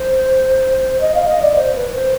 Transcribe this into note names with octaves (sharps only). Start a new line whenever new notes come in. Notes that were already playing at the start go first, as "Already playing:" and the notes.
Already playing: C5
D#5
F5
D#5
D5
C5
B4
C5